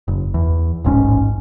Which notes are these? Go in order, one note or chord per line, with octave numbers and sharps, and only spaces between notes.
F#1
E2
D#1 A1 G#2 C#4